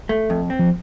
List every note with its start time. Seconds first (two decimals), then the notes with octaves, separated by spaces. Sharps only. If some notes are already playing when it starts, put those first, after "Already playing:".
0.09 A3
0.30 F2
0.50 C4
0.59 F3